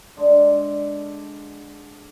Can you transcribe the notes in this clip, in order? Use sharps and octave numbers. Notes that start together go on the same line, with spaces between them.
D3 G#3 D4